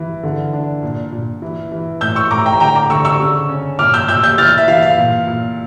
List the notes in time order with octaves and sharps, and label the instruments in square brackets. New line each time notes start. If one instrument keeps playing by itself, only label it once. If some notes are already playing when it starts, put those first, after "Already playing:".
Already playing: [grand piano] E3
D3
D4
A#2
A#2
E3
E3
A2 E6 G6
C#6 E6
A2 A#5 D6
G5 A#5
D3 G5 A#5
A#5 D6
D3 C#6 E6
C#6 E6
C#3
C#4
A#2 D6 F6
E6 G6
A#2 E6 G6
E6 G6
E3 F6 A6
E5
E3 F5
F5
A#2
A#2